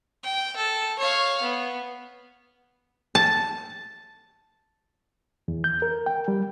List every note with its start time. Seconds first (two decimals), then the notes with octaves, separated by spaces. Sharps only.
0.23 G5
0.56 A4
0.99 C#5 F5
1.42 B3
3.15 A5
5.48 E2
5.64 G6
5.82 A#4
6.06 G5
6.28 G3